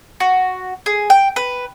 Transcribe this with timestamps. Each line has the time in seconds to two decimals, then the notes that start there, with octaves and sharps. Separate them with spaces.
0.20 F#4
0.86 G#4
1.10 G5
1.36 B4